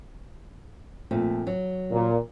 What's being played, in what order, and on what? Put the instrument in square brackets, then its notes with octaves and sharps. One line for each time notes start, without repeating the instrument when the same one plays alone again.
[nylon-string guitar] F2 A#2 A3
F#3
[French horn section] A#2